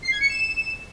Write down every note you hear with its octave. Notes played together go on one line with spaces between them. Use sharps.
C7
G#6
C#7
E7